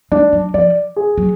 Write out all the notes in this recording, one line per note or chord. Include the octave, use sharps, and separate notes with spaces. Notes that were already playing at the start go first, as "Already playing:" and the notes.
G#3 D4
F#3
F3 D5
G#4
F#3